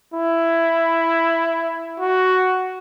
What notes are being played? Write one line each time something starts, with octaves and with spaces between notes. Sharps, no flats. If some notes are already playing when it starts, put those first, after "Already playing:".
E4
F#4